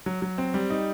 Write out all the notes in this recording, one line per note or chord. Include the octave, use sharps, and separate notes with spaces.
F#3
F#3
C4
G3
D#4